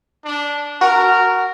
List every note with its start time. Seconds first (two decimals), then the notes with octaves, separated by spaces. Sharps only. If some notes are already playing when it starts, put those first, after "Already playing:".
0.25 D4
0.81 F#4 A#4